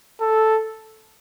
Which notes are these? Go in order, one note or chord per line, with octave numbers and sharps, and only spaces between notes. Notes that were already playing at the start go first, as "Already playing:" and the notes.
A4